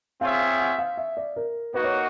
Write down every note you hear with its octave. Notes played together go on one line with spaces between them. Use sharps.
C4 F4 G#4 C#5 E5 F5
F#5
F5
E5
D5
A#4
A#3 D#4 F#4 B4
C#5